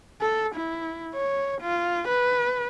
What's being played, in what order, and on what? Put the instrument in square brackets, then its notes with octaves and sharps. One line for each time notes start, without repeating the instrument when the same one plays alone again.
[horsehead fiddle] A4
E4
C#5
F4
B4